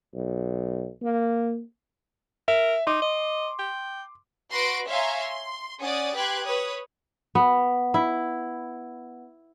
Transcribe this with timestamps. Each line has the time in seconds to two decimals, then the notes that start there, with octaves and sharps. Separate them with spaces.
0.14 B1
1.02 A#3
2.48 A#4 E5
2.87 D#4 C6 D6
3.02 D#5
3.59 G5
4.51 F#4 B4 C6 A#6 D7
4.88 C#5 E5 F5 G#5 A#5 C6
5.20 C6
5.80 C#4 D5 F#5 G#5 D#6 A6
6.15 G4 B4 G5 C6 F#6 G#6
6.44 B4 C#5 D#6
7.35 B3
7.94 E4